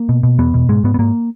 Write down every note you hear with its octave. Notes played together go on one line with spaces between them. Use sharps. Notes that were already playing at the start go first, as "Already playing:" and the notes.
Already playing: A#3
B2
B2
E2 B3
B2
G#2 G#3
G#2 B3
B3
G#2 A#3